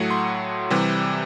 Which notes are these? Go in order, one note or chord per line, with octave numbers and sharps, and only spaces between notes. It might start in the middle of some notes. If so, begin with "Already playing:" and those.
Already playing: A2 F#3 A3 F#5
C6
C3 E3 G3